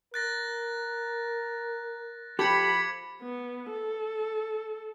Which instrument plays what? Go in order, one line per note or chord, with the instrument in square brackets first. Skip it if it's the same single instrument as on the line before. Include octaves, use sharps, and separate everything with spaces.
[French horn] A#4 [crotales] F#6 A6 A#6
[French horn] F3 [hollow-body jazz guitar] G4 A4 [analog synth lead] B5 [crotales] D6 G#6 C#7
[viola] B3
A4